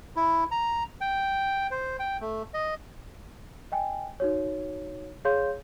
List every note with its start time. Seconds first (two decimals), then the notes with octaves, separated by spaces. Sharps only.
0.16 E4
0.51 A#5
1.01 G5
1.71 C5
2.00 G5
2.21 A3
2.54 D#5
3.72 D#5 G5 G#5
4.20 D#4 F#4 C#5
5.25 G#4 C#5 F5 C6 G6